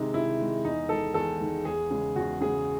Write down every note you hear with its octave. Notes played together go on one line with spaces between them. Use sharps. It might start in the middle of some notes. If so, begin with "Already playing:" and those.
Already playing: C3 D#3 G#3 D#4
C3 E4
D#3 G#3
E2 D#4
D#3 G#3 A4
E2 A4
D#3 G#3
E2 G#4
C#3 G#3
E2 F#4
C#3 G#3 G#4